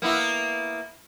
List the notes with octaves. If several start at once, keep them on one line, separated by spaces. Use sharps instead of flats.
A#3 B3 E4